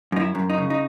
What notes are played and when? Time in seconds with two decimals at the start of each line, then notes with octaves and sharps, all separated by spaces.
0.12 F#2 D#4
0.20 E4
0.35 F#2
0.50 D#4
0.58 C#3
0.70 D#4